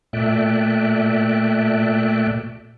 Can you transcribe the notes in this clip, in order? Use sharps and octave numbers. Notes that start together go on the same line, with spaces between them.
A#2 A3 D5 E5 G5 F#6